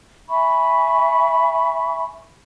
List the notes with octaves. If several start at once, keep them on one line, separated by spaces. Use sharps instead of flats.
E5 G#5 B5 C#6